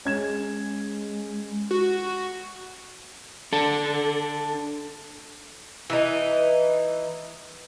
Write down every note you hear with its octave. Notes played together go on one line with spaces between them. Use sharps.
G#3 C#4 G#6 E7
F#4
D4 A4
E3 D#4